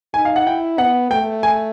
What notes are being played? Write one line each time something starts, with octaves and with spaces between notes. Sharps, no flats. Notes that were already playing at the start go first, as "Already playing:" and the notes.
D#4 G#5
F5
F#5
E4 G5
B3 F#5
A3 G5
G#5